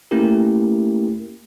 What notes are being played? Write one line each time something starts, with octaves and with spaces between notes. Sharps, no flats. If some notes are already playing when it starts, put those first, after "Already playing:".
A3 A#3 C#4 E4 G4 A#4